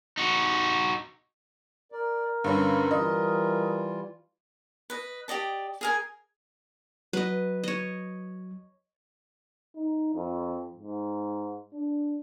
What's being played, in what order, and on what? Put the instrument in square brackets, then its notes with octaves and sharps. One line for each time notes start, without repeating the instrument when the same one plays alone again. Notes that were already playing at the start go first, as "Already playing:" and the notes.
[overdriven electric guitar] D#4 F#4
[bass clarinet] A#4 [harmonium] D5
[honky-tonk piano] G2 D3 C#4 [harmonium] B4
[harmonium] E3 G3 F4 [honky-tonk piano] D#5
[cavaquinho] B4 D#5
G4 D5 D#5 A5
G#4 A#4 G#5
[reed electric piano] F#3 [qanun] B4 D#5
[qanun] C#5 D#5
[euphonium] D#4
F2
G#2
D4